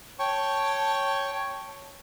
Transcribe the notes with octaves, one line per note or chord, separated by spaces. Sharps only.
C#5 G5 A5 C#6